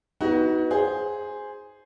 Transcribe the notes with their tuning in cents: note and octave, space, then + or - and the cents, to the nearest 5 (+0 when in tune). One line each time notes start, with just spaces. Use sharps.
B3 +0 D#4 +35 F#4 +15
G#4 +0 C5 +0